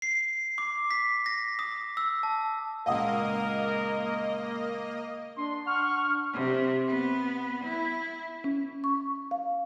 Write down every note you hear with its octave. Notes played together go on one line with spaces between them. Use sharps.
C7
D6
B6
A#6
D#6
E6
A5
C#2 A#2 A#3 A#4 D#5 F5 F#5 D#6
D4 C6
F#5 C#6 F6
C3
B3
E4
C#4
C#6
F5